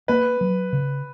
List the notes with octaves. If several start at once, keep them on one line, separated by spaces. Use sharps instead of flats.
A#3 B4
F#3
C#3